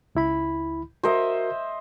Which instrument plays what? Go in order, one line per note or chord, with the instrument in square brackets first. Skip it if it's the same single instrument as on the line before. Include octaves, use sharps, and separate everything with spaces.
[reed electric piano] C#2 E4 B5
[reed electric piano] F#4 A#4 [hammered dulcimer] C5 D#5 E5